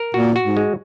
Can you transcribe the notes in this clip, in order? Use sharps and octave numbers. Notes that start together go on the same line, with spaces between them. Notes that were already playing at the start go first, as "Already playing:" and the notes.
Already playing: A#4
A#2 F#4
F#4
G#2
G#3